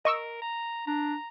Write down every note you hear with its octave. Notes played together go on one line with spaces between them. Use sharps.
A#4 D#5 C#6 E6
A#5
D4 A#5